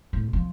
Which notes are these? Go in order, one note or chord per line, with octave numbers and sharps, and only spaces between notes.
A2
F3